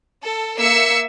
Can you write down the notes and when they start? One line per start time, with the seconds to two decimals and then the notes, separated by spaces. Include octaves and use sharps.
0.22 A4
0.57 A#3 E5 E6 C7 C#7